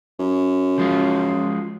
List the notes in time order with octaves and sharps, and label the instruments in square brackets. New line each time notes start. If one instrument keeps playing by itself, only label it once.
[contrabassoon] F#2
[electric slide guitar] F3 G#3 F4